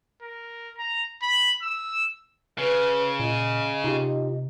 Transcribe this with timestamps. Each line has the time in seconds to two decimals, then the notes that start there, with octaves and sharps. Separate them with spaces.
0.22 A#4
0.78 A#5
1.22 B5
1.62 E6
2.58 C#3 B4
3.20 A#2 D#5
3.84 C3 D#4 F4 G4